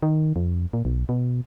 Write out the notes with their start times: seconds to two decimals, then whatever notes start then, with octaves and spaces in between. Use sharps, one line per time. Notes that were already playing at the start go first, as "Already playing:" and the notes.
0.03 D#3
0.36 F2
0.73 A#2
0.85 B1
1.09 B2